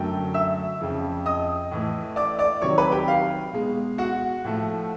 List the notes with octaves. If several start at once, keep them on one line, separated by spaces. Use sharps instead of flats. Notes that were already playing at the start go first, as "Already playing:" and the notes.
Already playing: F#2 D3 F#3 A3 G5
E5 E6
F2 C#3 F3
D#5 D#6
A2 E3 A3
D5 D6
D5 D6
C3 D#3 F#3 C#5 C#6
B4 B5
G4 G5
F5
B2 G#3
F#4 F#5
A2 F3 A3